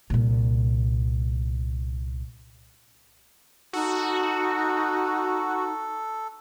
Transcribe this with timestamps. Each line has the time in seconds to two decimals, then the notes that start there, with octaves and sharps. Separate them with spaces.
0.10 C2 A#2
3.73 D#4 F#4 A4